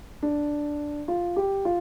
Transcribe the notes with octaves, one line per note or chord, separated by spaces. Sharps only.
D4
F4
G4
F4